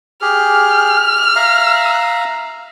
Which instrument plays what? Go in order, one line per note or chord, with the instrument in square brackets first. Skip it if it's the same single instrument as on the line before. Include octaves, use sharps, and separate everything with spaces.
[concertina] G4 G#4 [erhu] F6
[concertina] E5 F5 A#5